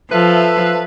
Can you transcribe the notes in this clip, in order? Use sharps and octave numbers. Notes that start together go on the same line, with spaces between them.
F3 A4 B4 E5